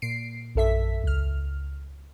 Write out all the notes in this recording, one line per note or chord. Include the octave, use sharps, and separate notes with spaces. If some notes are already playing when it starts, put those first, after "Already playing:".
A#2 C7 D7
A#1 F#2 A4 E5 B6
C#2 F6